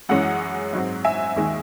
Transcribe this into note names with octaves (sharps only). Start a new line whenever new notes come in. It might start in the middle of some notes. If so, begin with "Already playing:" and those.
F#2 E3 G#3 C#4 F#5
G#2 F#3 C4
E5 G#5
D#2 D#3 G#3